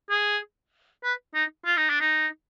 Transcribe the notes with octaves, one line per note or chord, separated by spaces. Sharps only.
G#4
B4
D#4
F4
D#4
D4
D#4